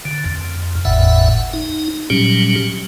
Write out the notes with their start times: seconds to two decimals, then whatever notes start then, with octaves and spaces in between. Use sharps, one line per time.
0.05 D3
0.25 F2
0.85 G1 E2 A2 E5 F#5
1.53 D#4
2.10 A#2 F#3 G3 C#4 G4